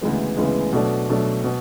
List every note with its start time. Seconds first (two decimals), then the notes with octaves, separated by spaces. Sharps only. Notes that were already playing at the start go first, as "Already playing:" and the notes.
0.01 D2 C#3 E3 G#3 B3
0.37 D2 C#3 E3 G#3 B3
0.72 B2 F#3 A3 D4
1.09 B2 F#3 A3 D4
1.44 B2